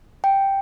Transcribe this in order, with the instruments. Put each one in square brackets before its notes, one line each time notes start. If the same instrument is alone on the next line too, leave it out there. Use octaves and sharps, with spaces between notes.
[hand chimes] G5